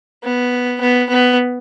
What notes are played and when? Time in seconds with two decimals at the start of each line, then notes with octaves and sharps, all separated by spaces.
0.23 B3
0.80 B3
1.09 B3